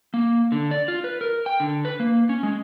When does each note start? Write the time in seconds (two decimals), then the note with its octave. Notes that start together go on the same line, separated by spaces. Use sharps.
0.14 A#3
0.52 D3
0.71 D5
0.88 F4
1.04 B4
1.21 A#4
1.46 G5
1.60 D3
1.85 B4
2.00 A#3
2.29 C#4
2.43 G#3